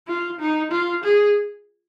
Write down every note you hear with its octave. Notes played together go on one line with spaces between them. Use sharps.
F4
D#4
F4
G#4